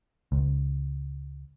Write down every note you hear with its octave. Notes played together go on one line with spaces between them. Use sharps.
C#2